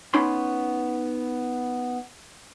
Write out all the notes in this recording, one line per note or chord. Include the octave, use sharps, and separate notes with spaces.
B3 C#4 D#4 B5 C6